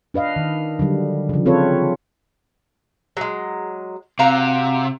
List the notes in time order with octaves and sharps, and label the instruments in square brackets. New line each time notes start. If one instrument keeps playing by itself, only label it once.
[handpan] D4 B4 D#5 F5
D#3
D3 F#3 G3
C#3 F3
C4 F4 A4 B4 C#5
[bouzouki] F#3 G#3
[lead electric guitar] C3 [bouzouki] F#4 F5 A#5